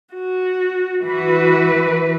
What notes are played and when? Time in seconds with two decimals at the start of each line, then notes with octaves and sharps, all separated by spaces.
0.14 F#4
1.04 E3 F#4 B4